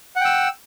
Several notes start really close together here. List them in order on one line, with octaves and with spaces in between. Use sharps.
F#5 G5 E6